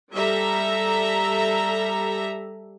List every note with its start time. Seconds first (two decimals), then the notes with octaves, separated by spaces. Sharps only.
0.13 G3 A4 E5 A#5